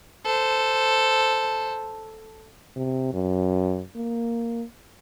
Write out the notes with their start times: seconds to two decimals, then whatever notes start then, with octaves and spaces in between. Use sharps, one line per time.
0.25 A4 C5
2.76 C3
3.13 F#2
3.96 A#3